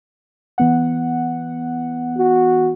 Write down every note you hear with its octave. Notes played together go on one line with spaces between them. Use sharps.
E3 B3 F#5
F#4